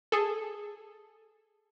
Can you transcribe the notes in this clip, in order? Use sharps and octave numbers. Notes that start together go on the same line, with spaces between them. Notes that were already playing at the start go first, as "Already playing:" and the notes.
G#4 A4